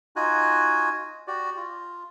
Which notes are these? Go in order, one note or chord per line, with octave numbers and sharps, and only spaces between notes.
D#4 F4 F#4 G#5 F#6
F#4 G4 D5
F4